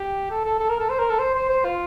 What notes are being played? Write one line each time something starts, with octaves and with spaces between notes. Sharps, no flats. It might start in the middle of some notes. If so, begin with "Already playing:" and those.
Already playing: G4
A4
A4
A4
A#4
A4
C5
A#4
A4
C5
C5
C5
F4